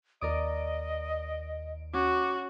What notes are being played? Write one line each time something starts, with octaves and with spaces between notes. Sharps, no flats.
D#2 A#4 D5 D#5 D#6 D7
C#4 F#4 D6